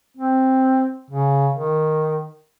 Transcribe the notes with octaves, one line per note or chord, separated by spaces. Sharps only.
C4
C#3
D#3